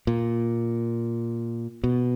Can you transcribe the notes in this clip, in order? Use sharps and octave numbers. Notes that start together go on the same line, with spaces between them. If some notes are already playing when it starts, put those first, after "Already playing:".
A#2
B2